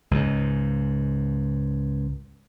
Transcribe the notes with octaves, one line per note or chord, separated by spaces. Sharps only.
C#2 G#2